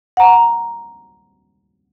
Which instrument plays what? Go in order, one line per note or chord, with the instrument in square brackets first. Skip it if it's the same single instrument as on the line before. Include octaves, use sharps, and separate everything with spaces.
[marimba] F#5 A#5